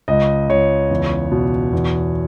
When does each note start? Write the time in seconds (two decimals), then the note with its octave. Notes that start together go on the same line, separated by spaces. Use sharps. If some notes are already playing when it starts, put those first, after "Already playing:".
0.08 C#2 D#5
0.49 C#2 C#5
0.90 E2
1.32 B2
1.73 E2